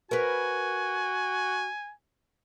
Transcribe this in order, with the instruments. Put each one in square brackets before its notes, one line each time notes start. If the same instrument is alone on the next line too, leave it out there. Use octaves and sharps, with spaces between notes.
[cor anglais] F#4 [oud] A#4 B4 [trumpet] G#5